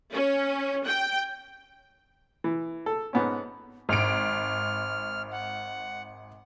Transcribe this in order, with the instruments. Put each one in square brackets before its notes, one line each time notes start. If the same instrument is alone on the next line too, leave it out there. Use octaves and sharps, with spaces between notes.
[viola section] C#4
G5
[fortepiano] E3
A4
G#2 B3 C#4
[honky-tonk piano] G#1 D7 [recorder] F6
[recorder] F#5